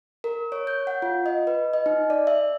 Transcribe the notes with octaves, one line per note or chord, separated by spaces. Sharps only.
A#4
C#5
G6
F#5
F4
D#5
B4
D#5
D#4
D5
E5